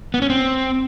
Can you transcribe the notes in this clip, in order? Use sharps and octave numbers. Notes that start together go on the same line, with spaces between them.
B3
C#4
C4